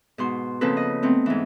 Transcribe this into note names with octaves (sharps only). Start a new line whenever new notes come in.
G#2 B2 C6
C#3 F3 A#3 C4 A4 B4
D#5
A3 B3 C4
G#2 E3